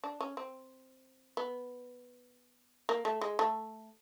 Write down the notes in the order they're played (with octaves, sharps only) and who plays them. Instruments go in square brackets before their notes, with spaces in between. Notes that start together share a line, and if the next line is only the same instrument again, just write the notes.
[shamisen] D4
C#4
C4
B3
A#3
A3
G#3
A3